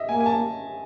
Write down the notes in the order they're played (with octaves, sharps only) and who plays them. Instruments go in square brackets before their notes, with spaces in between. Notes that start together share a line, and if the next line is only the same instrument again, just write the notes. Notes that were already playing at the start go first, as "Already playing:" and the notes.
Already playing: [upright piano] D#5 E5
[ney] A#3 [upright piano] G#5
[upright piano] G#5
A5